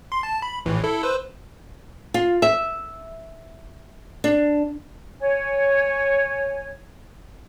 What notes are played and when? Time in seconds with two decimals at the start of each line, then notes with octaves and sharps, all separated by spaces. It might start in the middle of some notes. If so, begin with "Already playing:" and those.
0.12 C6
0.23 A5
0.42 B5
0.66 A#1 A2 E3
0.84 E4 A4
1.03 B4 C5 E6
2.14 F4
2.42 E5
4.24 D4
5.19 C#5 G#5